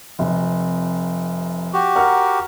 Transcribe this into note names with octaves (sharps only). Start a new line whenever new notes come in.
F1 C3
F#4 G4
A#4 F#5 F6